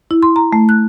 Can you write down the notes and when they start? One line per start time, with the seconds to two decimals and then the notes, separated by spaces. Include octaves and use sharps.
0.11 E4
0.23 C6
0.36 A#5
0.53 A3
0.69 F#6